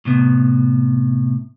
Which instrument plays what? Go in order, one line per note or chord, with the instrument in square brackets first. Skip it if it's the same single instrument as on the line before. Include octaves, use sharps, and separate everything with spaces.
[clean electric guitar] A2 C3 B3